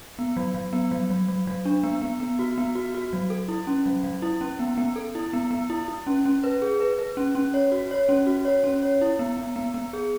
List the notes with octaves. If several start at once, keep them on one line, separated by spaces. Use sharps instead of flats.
B3
F#3
F#3
B3
F#3
F#3
F#3
F#3
D4
B3
B3
B3
F#4
B3
F#4
F#4
F#3
A4
E4
C#4
F#3
F#3
E4
C#4
B3
B3
A4
E4
B3
B3
E4
E4
C#4
C#4
B4
G#4
B4
B4
C#4
C#4
C#5
F#4
C#5
C#4
F#4
C#5
C#4
C#5
E4
B3
B3
B3
B3
G#4